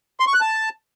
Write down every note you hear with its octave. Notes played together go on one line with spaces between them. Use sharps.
C6
C#6
F#6
A5